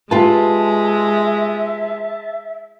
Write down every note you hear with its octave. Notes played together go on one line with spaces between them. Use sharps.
G#3 F4 G4 B4 E5 A5